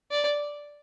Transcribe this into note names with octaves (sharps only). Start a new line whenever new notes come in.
D5